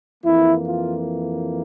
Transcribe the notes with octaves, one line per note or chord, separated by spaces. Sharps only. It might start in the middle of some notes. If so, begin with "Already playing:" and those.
F2 E3 A#3 E4
F4